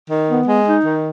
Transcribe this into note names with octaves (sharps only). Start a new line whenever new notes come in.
D#3
B3
G#3
D#4
D#3